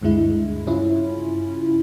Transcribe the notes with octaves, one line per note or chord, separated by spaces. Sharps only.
D2 G2 D3 G#3 E4
G2 C#3 C#4 E4 F4